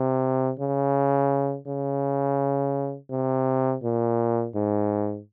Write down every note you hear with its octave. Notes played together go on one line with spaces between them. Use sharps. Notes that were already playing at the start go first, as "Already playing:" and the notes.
Already playing: C3
C#3
C#3
C3
A#2
G#2